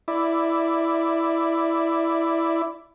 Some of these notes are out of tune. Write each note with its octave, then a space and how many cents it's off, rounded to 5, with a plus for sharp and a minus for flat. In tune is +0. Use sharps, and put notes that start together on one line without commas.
E4 +0 D5 +0